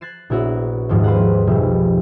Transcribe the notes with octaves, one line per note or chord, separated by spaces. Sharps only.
F#6 G#6 A6 C7 E7
A#1 B3 E4 F#4 C#5
D#2 G#2 F3 A#3 C4
B4 C5 F5 F#5
F1 B1 F3 G3 E5